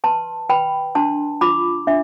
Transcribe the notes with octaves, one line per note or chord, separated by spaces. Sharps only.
B4 A5 C6
B4 G5 B5
D4 A5 C6
F4 B5 D6
D4 E5